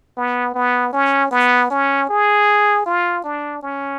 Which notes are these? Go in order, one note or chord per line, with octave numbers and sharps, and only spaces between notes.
B3
B3
C#4
B3
C#4
G#4
F4
D4
C#4